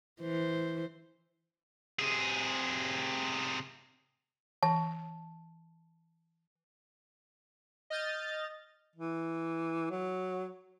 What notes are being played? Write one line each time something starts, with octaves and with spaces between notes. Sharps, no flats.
E3 C5
C3 G#4
E3 A5
D#5 F6 G6 A6
E3
F#3